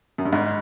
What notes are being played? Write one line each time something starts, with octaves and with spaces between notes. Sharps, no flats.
F#2
G2
G#1 G#2